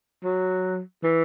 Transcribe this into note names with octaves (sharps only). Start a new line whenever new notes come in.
F#3
E3